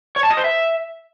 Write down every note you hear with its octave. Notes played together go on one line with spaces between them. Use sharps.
C#5
A5
D#5
C5
E5